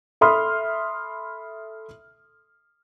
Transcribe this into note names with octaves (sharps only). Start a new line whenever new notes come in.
A4 E5 B5 C6 D#6 F6